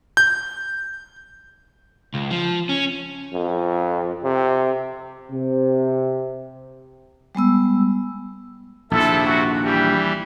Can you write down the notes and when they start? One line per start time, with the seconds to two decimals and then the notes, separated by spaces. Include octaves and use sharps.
0.17 G6
2.14 C#2
2.31 F3
2.69 C#4
3.34 F2
4.23 C3
5.31 C3
7.35 G3 G#3 B3 E6
8.91 A#1 D#2 C3 E4 A4
9.26 F#4
9.63 E3 G3 G4